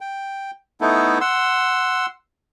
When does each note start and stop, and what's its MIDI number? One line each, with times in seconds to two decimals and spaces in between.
0.01 0.51 79
0.81 1.18 57
0.81 1.18 59
0.81 1.18 63
0.81 1.18 64
0.81 1.18 69
1.21 2.06 78
1.21 2.06 84
1.21 2.06 88